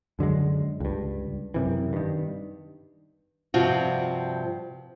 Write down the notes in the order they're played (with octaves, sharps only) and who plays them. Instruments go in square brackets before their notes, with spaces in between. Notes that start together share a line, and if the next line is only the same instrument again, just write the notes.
[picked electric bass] F#2 D3 F#3 G#3
C#2 G2
F#2 C3 E3
G2 D#3
[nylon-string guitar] G2 C3 F3 F4 F#4